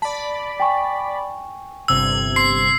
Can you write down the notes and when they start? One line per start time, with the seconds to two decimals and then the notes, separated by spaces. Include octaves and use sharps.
0.02 D5 A5 B5
0.60 G5 G#5 C#6
1.88 G1 C3 E6 G#6
2.36 C6 C7